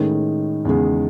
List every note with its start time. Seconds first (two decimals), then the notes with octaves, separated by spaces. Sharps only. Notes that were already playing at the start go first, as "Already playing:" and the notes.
Already playing: A2 D#3 G#3 C#4
0.65 E2 C#3 G#3